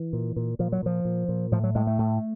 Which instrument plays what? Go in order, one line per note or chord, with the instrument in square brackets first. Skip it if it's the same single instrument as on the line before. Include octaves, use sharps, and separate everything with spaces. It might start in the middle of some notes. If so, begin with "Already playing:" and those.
Already playing: [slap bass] E3
A#2
A#2
A#2 F3
F#3
A#2 F3
A#2
A#2
A2 F3
F#3
A2 G#3
A3
A2